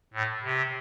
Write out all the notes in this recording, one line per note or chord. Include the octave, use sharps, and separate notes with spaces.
A2
C3